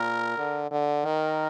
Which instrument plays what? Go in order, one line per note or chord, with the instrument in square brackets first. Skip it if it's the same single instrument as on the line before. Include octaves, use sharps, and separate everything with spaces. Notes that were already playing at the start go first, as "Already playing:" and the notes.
Already playing: [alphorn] A#2 [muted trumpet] A#4
[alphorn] D3
D3
[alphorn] D#3 [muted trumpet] A#4